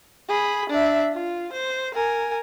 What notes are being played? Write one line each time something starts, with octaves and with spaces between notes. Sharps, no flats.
G#4 B5
D4 E5
F4
C5
A#4 G#5